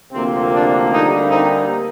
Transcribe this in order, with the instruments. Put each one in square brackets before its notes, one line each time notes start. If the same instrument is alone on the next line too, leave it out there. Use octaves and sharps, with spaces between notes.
[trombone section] D2 C3 F3 A#3 C4
D4
D2 D3 G3 A#3 C4 D#4
C4 D#4